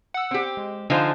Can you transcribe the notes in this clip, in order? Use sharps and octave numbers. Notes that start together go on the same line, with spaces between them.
F#5 E6
C4 G4
G#3
D3 F3 D#4 C5 F5 G#5